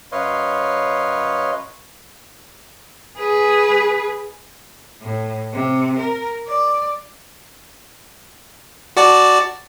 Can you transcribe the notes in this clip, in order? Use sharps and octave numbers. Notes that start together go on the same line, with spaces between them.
F#2 B4 C#5 D#5 F5 C6
G#4 B4
A2
C3
A#4
D5
F#4 D5 A5